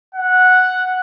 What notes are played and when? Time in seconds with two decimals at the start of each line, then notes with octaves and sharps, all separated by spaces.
0.15 F#5